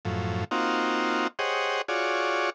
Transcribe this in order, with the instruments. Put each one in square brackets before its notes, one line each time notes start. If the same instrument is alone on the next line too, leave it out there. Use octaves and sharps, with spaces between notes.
[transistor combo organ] F#2 A2 F3
A#3 C4 D#4 F4 F#4
G4 G#4 C5 C#5 D#5 F#5
F4 F#4 G#4 C#5 D5